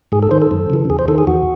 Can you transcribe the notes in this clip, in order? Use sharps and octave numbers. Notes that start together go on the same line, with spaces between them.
G#2 G#4
A4
D#3 C5
A4
F#2
C#3 E3
E2 G#4
C5
D#3 A4
G#4
E2 F#4